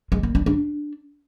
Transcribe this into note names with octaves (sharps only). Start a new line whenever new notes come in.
G#3
A#3
D4
D4